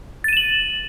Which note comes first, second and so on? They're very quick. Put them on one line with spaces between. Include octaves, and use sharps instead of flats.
A6 D#7 E7 F#7